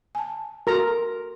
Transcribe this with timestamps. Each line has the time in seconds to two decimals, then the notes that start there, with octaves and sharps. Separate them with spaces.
0.15 G#5 A5
0.67 F#4 A4 A#4 A#5 C6